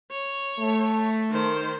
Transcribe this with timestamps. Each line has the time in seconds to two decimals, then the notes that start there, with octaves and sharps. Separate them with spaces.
0.11 C#5
0.60 A3
1.31 D#3 C5